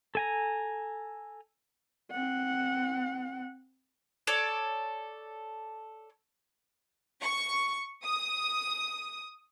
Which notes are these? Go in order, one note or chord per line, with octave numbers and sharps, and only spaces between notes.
A4 G#5 A#5
C4 F#5
A4 C#5 D5
C#6
D#6